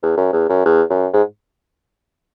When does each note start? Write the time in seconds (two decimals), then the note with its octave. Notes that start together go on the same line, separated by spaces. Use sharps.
0.03 E2
0.17 F#2
0.33 E2
0.49 F#2
0.65 E2
0.90 F#2
1.13 G#2